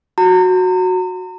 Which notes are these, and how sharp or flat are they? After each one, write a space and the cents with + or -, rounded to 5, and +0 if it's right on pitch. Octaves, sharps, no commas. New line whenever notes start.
F#4 -5 A#5 -35